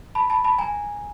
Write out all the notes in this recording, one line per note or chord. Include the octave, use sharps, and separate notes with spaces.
A5 B5
A5 B5
A5 B5
G#5 A#5